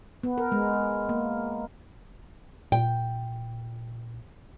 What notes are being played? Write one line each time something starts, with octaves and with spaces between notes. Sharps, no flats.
B3
A#4
G#3
A#3
A#2 G5